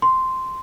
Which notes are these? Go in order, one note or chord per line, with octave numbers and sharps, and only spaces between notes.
C6